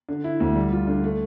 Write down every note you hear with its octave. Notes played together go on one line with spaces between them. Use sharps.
D3
E4
D2
G3
F4
D3
A3